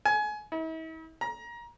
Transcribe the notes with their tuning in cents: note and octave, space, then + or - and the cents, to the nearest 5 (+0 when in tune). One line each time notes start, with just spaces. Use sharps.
G#5 +25
E4 -45
A#5 +25